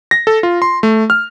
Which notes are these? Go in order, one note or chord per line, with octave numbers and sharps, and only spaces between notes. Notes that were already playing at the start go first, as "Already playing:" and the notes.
A#6
A4
F4
C6
A3
F6